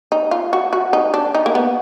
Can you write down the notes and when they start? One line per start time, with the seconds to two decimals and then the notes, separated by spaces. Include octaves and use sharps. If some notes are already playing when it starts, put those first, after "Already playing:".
0.12 D#4
0.31 F4
0.53 F#4
0.73 F#4
0.93 D#4
1.14 D4
1.35 D#4
1.46 A#3
1.55 B3